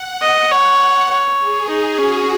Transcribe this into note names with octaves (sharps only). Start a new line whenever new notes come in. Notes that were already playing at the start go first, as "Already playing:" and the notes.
Already playing: F#5
D#5
C#5 F#5
C#5
G#4
D#4
C#4 F#4